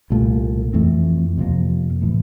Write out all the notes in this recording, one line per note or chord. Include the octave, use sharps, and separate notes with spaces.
C2 A#2 A3
F2 E3 A3 C4
F2 C3 F3 A#3
A2 E3 A3